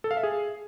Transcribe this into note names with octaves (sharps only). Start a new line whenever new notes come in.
A4
F5
E5
G#4